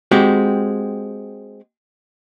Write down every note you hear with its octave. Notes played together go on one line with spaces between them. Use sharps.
G#3 C4 F#4 G4